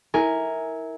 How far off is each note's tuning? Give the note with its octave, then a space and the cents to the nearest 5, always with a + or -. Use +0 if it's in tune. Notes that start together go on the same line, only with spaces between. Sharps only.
E4 -25 A#4 +0 G#5 +0